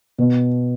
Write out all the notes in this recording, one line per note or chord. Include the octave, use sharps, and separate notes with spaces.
B2